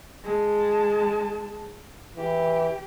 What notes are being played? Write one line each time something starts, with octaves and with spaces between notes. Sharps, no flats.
G#3 A5
E3 G4